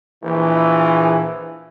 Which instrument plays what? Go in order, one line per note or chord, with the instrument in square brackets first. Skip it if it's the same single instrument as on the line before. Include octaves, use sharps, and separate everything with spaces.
[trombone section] A#1 E3